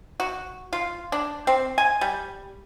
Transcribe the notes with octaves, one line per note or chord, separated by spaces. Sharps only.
F#4
F4
D4
C4
G#5
G3